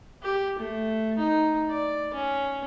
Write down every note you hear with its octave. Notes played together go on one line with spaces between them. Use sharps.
G4
A3
D#4
D5
C#4